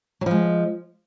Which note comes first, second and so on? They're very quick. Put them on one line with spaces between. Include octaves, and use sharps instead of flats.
F#3 F3 G#3